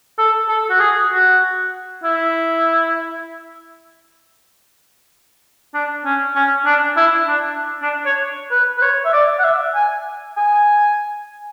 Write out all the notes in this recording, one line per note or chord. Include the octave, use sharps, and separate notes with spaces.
A4
A4
F#4
G#4
F#4
E4
D4
C#4
C#4
D4
E4
D4
D4
C#5
B4
B4
C#5
E5
D5
F#5
E5
G#5
G#5